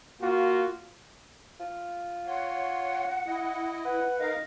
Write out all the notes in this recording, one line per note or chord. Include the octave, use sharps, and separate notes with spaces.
A#3 F4 F#4
F4
C#5 F#5 C6
E4 D#5
B4 F#5
D#4 A#4 D#5 F5